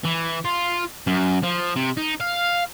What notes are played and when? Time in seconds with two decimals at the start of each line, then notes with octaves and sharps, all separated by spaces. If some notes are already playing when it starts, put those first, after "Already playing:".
0.04 E3
0.45 F4
1.07 F#2
1.43 F3
1.76 C3
1.97 D#4
2.20 F5